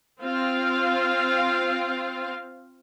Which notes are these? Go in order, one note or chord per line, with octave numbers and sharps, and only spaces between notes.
C4 F4 F5